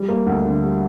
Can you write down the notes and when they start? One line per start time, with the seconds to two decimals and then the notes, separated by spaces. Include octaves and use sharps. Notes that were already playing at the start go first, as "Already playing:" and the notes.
Already playing: G3
0.09 A#3
0.26 D2
0.45 D3
0.63 G3